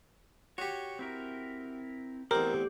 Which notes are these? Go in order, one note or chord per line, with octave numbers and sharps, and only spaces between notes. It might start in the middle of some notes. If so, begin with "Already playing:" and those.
F#4 G4 C#5
C4 E4 A#4
E2 A3 C4 G4 A#4 D5